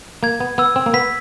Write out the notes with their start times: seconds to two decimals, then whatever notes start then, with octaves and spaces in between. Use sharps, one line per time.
0.23 A#3 G#6
0.40 B3
0.58 B3 E6
0.76 C4
0.86 A#3
0.94 B3 B6